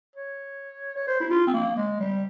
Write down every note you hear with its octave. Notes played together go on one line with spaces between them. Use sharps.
C#5
C#5
C5
E4
F4
C4
A#3
G#3
G3